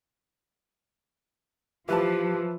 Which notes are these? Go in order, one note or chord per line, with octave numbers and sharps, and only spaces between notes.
E3 F3 G4 B4 A5